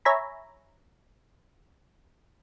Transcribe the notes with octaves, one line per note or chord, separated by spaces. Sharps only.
C#5 E5 G#5 A#5 B5